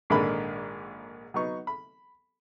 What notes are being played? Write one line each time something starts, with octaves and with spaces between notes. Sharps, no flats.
A#1 G#2 D3 D#3 A#4 B5
F#3 B3 D#4 C#6
B5